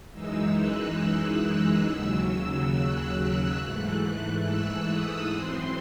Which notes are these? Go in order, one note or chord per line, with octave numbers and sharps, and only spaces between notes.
F#2 E3 G#3 D#4 E6
F#6
E6
F#6
D#2 C#3 F#3 E6
E6
F#6
G#2 E3 A3
E6
D#6
F#2 E3 C4 C6